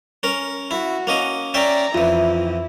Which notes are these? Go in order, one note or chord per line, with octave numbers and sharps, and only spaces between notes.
C#4 A#4
E4 F#4
A#3 C#4 D#5
C#4 D5 E5 G5 A#5
F2 E3 E4 F4 E5